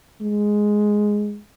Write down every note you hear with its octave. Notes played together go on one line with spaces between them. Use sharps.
G#3